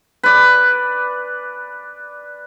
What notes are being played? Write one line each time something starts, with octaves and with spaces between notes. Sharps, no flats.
B4 D5